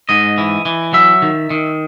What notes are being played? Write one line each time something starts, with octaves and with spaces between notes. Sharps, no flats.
G#2 D#5
E3
E3
F#3 E5
D#3
D#3